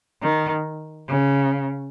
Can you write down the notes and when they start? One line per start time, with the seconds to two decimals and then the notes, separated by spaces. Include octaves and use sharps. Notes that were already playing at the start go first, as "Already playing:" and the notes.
0.22 D#3
1.07 C#3